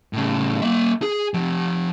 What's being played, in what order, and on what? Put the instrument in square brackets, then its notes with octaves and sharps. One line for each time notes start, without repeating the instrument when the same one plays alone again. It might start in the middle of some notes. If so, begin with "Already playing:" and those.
[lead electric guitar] A2 C#3
A#3 E5
G#4
F3 G4